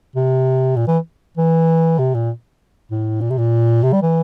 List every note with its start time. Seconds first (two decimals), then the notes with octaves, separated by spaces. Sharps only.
0.16 C3
0.76 A#2
0.87 E3
1.37 E3
1.98 C3
2.14 A#2
2.91 A2
3.21 A#2
3.30 C3
3.38 A#2
3.83 C3
3.93 G3
4.02 E3